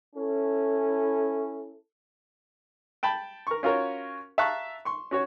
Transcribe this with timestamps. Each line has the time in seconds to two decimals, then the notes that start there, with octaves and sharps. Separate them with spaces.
0.16 C#4 E4 A4
3.03 G5 A5 B5
3.47 A#4 C#6
3.63 C#4 F4 F#4 A#4 C#5
4.38 E5 F5 A5 A#5 C#6 F#6
4.85 C6 C#6
5.11 C#4 F#4 C#5